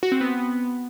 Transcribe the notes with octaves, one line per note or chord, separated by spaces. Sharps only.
F#4
C4
B3